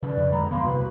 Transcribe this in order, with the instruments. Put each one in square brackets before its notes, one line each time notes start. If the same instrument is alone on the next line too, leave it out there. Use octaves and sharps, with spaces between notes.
[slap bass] C#3 [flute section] B4 D5
[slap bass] F2
[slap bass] D3 G#3 [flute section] A#5 B5
[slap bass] F2 A#3 B3 [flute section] F5 B5 C6
[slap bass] C2 [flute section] F#4 B4 B5